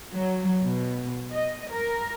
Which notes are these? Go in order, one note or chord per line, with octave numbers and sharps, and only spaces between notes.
F#3
B2
D#5
A#4